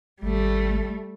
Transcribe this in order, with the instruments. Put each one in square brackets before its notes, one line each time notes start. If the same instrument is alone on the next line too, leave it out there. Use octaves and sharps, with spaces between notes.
[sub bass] G#1 [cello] G3 A3